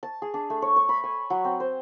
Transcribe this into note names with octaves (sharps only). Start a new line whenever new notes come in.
A5
G#4
D4
A3
C#5
C#6
B5
G#5
F#3
C4
C5